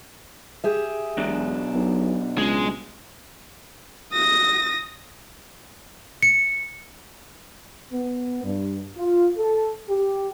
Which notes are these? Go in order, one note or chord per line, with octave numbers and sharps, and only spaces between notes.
G4 G#4 E5
E1 B2 F#3 D4
B1
C#2 G#3
D#6 A#6
C#7
B3
G2
F4
A4
G4